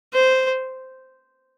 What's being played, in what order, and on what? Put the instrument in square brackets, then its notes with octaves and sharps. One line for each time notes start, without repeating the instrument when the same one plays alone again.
[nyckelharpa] C5